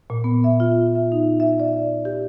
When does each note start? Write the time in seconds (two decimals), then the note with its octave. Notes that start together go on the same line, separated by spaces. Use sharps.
0.10 A#2
0.24 B3
0.44 E5
0.60 F4
0.95 E5
1.12 D#4
1.40 E5
1.60 D5
2.05 G4